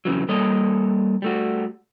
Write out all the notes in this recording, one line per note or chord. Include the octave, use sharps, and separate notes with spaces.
F2 G#2 C#3 E3 F#3
G3 A#3 A4 C#5 D#5
G3 A3 F#4